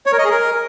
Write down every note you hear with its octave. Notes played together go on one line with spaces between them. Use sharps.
C#5
A#4
D#5
G#4
A#4